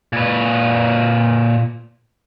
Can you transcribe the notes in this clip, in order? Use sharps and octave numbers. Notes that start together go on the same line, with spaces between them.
A#2 B4